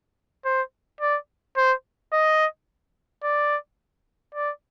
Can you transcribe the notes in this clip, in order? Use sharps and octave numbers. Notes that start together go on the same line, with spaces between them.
C5
D5
C5
D#5
D5
D5